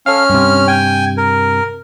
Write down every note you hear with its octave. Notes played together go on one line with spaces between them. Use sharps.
C#4 A4 F5 F6
G2 C3
G5 G#5
A#4